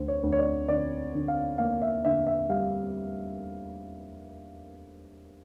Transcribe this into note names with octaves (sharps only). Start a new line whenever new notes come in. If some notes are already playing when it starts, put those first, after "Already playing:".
Already playing: D2 C5
C#5
D2
C#5
D5
D3 D5
D3
F5
A#3 F5
E5
D3 E5
E5
G3 F5